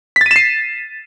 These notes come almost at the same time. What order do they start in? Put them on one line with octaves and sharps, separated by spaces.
B6 A6 D#7 E7 C7